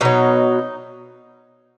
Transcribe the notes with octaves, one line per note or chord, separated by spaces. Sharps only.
B2 F#3 D#4